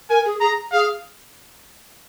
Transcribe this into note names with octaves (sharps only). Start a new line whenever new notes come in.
A#4 G#5
G#4
G#4 A#5
G#4 F5